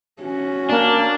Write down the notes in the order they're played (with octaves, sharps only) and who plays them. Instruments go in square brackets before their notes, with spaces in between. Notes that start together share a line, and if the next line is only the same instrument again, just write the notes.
[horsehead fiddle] C#4 F#4
[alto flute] A#3 [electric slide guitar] D4